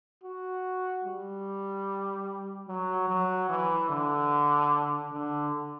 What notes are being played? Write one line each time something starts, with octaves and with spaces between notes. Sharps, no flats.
F#4
G3
F#3
F#3
E3
D3
D3